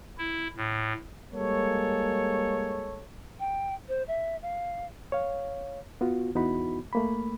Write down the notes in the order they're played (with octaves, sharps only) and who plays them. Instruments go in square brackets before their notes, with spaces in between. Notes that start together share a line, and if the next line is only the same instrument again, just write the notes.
[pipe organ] E4
A2
[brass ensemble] G3 G#3 A#3 A4 C#5
[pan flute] G5
C5
E5
F5
[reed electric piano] C#5 F5
B3 F4 F#4
E2 B3 D#4 E4 F#4 B5
A3 A#3 B5